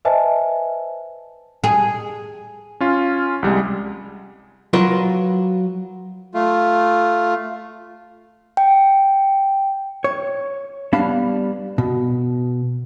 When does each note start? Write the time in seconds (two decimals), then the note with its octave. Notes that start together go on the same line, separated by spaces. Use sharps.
0.05 B4 C5 D#5 E5 G#5 A5
1.64 G#4
2.80 C#4 F4
3.43 C2 G3 G#3
4.73 F#3 F4 A#4 B4
6.34 A3 F4
8.57 G5
10.04 C#5
10.93 G3 B3 D4 F5 A5 B5
11.78 B2